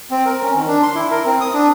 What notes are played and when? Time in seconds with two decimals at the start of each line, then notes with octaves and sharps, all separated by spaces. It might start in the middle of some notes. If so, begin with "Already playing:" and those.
0.11 C4
0.26 A#4
0.43 C#4
0.56 D#3
0.67 D4
0.82 C6
0.95 E4
1.11 A#4
1.26 C4
1.41 D#6
1.54 D4